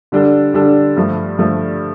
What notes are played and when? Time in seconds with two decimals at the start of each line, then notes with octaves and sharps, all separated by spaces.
0.12 D3 G3 D4 A4
0.54 D3 G3 D4 A4
0.97 G2 F3 A3
1.39 G2 F3 A3